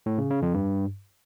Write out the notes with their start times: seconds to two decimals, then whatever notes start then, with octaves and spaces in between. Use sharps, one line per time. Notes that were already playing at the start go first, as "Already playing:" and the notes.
0.06 A2
0.18 C#3
0.30 C#3
0.42 F2
0.54 G2